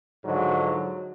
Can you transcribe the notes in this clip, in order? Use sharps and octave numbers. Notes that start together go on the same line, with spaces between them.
G#2 D3 F3 F#3